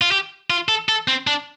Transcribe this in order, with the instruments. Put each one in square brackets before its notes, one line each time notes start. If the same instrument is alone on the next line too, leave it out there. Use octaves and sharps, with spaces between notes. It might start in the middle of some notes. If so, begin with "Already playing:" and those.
[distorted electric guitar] F4
G4
F4
A4
A4
C4
D4